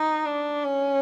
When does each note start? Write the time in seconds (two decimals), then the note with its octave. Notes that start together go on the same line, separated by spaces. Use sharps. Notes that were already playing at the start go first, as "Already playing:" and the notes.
Already playing: D#4
0.26 D4
0.64 C#4